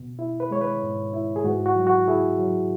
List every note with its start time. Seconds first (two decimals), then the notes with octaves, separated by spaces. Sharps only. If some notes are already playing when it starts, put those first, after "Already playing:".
Already playing: B2
0.19 E4
0.40 B4
0.51 G#3 C#5
0.61 B4
0.83 G#2
1.13 E4
1.36 G#4
1.44 G#2 F#4
1.66 F#4
1.76 F#3
1.87 F#4
2.08 E4 G#4
2.39 F#3